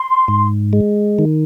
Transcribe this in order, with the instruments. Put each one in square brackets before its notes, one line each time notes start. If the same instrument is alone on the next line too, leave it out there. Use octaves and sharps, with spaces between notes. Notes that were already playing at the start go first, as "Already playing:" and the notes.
Already playing: [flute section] C6
[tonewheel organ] G#2
G#3
D#3